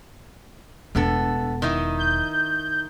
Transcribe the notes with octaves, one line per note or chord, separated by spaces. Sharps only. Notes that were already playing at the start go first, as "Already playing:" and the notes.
E1 A2 B3 D4 A4
D#3 D#4 E4
G6